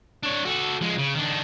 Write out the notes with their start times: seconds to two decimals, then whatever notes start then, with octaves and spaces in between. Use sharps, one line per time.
0.23 D4 C#5
0.45 F#4 A4
0.81 F3 G#3
0.98 C#3
1.15 D#3 D4